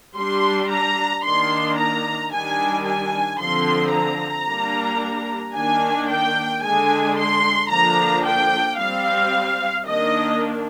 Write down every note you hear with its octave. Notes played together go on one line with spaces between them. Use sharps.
G3 D4 C6
A#5
D#3 A#3 D4 C6
A#5
D#3 G3 D4 G#5
G#5
D3 F3 C4 C6
A#5
G3 A#3 D4
D#3 A#3 D4 G#5
G5
D3 G#3 D4 G#5
C6
D3 F3 A#3 D4 A#5
G5
G3 C4 F5
D#3 A#3 D4 D#5